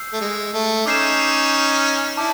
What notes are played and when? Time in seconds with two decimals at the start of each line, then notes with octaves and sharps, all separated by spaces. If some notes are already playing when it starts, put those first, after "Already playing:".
Already playing: E6 G6 C7
0.13 A3
0.21 G#3
0.54 A3
0.86 C#4 D#4 D6 G6 C7 E7
2.17 D4 E4 A5 D6